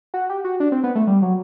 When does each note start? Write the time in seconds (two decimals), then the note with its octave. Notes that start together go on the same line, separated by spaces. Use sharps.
0.14 F#4
0.30 G4
0.44 F#4
0.60 D4
0.72 C4
0.83 B3
0.95 A3
1.07 G3
1.22 F#3